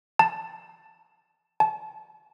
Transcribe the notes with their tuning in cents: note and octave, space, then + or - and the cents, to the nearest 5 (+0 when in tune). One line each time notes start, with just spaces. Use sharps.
A5 +5
A5 -30